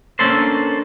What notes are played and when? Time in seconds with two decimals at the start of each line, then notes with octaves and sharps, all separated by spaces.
0.19 A#3 C#4 D4 A4 A#4 C5